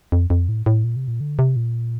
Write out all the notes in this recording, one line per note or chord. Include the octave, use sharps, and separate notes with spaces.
F2
F2
A2
A2
A#2
C3
A#2
D3
C3
A#2